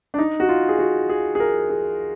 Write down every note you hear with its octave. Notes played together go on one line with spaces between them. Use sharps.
D4
D#4
F#4
F4
G#4
F#4
G#4
G#4
A#4
G#4